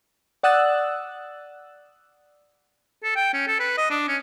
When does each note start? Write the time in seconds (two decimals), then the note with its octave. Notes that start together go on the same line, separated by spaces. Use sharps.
0.43 D5 F#5 D#6 E6 F#6 A6
3.04 A4
3.16 G5
3.33 C#4
3.48 A4
3.60 B4
3.78 D#5
3.90 D4
4.08 C#4